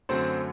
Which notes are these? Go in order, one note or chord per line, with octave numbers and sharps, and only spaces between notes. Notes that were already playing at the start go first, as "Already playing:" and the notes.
F#2 D3 F#3 A3 C4 C5